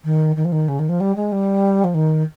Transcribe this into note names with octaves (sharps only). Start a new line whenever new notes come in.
D#3
D#3
F3
D#3
C#3
D#3
F3
G3
G#3
G3
F3
D#3